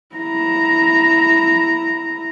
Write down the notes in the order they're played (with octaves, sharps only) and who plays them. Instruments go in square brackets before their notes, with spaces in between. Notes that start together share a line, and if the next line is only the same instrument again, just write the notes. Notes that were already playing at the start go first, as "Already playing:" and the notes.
[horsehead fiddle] E4 A#5